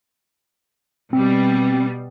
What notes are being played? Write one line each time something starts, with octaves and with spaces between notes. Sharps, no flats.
B2 G3 C4